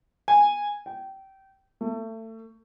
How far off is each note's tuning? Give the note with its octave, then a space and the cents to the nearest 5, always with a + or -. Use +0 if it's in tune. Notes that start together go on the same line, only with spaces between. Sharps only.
G#5 -10
G5 -20
A3 +30